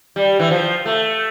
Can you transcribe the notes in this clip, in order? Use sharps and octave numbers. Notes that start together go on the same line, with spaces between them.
G3
E3
F3
A3